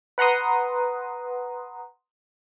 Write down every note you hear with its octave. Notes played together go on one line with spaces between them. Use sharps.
B4 F#5 A#5 C6 D#6